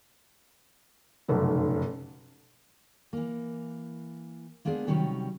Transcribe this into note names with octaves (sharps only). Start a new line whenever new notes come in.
F1 B1 F#2 C#3
E3 A#3
G#3 A#3 B3 D4 G#4
C3 D#3 F#3 G3 C#4